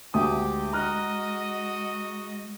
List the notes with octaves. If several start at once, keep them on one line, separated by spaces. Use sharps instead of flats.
D2 G#3 G4 D#6
F#4 D#5 A#5 F6 F#6